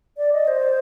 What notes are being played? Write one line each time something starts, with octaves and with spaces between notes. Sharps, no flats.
D5
D#5
C5